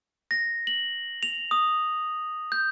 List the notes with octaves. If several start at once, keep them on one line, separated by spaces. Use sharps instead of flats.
A#6
F#7
F7
D#6
G6